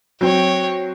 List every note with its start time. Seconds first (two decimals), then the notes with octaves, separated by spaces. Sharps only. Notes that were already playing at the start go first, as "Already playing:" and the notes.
0.21 F#3 C4 C#5 G5